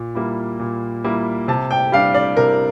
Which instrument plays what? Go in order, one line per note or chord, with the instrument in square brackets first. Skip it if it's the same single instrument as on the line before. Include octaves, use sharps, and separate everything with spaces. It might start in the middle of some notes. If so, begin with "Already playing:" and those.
Already playing: [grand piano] A#2
G3 A#3 E4
A#2
G3 A#3 E4
[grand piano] C3 [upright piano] A5
[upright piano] G5
[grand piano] G3 D4 [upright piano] F5
[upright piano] D5
[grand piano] C3 [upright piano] A#4